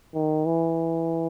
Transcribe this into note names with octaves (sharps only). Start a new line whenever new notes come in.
D#3
E3